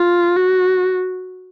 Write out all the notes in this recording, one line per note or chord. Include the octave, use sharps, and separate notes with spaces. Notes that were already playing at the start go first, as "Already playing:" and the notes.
Already playing: F4
F#4